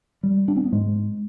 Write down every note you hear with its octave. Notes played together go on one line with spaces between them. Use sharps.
G3
D4
C4
B3
G#2 G#3